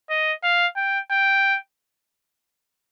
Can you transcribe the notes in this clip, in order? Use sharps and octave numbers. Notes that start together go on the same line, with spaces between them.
D#5
F5
G5
G5